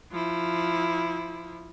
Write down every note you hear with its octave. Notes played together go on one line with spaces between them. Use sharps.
F3 E4